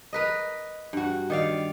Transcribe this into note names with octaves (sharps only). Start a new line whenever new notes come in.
A#4 B4 D#5
G2 F#4
D#3 D5 F5